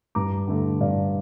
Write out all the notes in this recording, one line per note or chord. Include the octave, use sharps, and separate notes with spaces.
G2 A#5 D6
D3 A3
G2 D5 F5